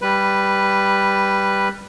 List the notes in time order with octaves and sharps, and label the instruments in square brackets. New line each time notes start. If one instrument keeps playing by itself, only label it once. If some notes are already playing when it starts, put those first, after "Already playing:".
[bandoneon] G3 B4